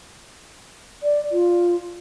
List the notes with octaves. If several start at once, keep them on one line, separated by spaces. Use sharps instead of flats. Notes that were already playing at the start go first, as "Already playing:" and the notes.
D5
F4